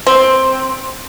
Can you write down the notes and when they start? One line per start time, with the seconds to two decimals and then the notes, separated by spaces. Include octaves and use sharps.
0.06 C4